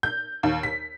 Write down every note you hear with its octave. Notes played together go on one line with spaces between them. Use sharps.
G6
D#2
B6